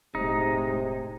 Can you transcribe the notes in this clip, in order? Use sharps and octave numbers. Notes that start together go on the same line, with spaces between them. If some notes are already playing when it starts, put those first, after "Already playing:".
E1 A2 C3 G#3 D#4